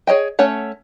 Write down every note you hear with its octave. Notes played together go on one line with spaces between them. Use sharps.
G#4 C#5 D#5 G5
A3 C#4 C#5 F#5